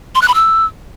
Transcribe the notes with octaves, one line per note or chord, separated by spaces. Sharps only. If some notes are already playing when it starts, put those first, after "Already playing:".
C6
F#6
B5
E6